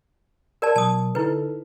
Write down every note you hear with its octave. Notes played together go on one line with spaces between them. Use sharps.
A#4 D5 A5
B2 F#3 A5 D#6
D3 D#4 E4 A4 B4